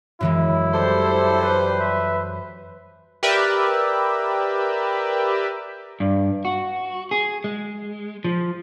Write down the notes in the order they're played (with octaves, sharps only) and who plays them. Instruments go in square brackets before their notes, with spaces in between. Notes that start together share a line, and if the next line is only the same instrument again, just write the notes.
[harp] F#2 E3 G#3 [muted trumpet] E4
[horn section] G3 C5 [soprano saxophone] A4
[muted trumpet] B4
[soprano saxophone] E5
[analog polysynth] G4 A#4 B4 D5 E5
[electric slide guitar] G2
F#4
G#4
G#3
F3